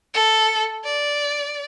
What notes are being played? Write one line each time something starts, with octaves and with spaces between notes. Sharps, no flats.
A4
D5